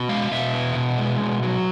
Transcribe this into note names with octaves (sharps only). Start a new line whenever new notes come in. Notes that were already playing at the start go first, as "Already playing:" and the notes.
Already playing: B2
G#3 F5
B2 E5
B3
B2
G#3
B2
F#3